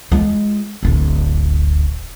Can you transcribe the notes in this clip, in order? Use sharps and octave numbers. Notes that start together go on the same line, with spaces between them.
G#3 F4
D1 G1